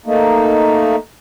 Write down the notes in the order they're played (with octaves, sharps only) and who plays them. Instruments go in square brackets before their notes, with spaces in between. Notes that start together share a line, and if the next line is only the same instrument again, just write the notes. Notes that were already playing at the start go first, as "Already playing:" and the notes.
[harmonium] A3 A#3 D#4